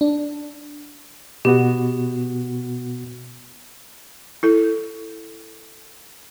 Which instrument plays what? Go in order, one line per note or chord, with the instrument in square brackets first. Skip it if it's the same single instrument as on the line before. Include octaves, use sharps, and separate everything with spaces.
[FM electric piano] D4
[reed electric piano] B2 B3 F#4 [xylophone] G4
[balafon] E4 A4